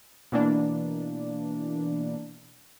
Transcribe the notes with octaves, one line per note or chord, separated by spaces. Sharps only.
B2 E3 A#3 D4